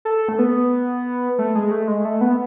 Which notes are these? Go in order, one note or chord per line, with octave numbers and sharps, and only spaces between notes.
A4
A3
B3
A3
G#3
A3
G#3
A3
B3